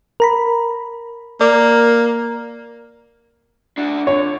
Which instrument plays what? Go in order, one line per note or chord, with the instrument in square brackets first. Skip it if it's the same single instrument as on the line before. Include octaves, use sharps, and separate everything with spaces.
[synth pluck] A#4 A#5 B5
[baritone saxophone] A#3 [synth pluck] D5
[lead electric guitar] D4 F#4
[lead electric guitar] D3 [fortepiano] C#5